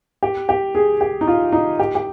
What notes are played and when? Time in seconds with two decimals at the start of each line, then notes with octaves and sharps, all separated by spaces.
0.23 G4
0.49 G4
0.75 G#4
1.01 G4
1.21 D#4
1.27 F4
1.52 D#4
1.79 G4
1.95 G4